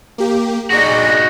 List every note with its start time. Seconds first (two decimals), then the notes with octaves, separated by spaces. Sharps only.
0.18 A#3 G4
0.70 D#4 F#4 G#4 D5